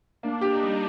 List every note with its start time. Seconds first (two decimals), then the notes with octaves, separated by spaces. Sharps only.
0.23 A#3 D4
0.41 G4
0.52 D#4
0.62 G3